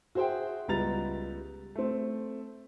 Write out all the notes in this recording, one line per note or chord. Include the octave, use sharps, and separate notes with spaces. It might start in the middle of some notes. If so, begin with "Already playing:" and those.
F#4 G#4 C5 E5 G5
C#2 G3 B3 A#5 A6 F7
A3 C4